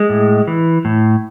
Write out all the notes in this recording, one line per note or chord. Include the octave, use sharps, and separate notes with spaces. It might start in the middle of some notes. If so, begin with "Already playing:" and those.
Already playing: G#3
A2
E3
A2